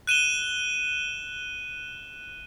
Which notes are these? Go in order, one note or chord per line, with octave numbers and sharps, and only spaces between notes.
F#6 D#7 E7 G7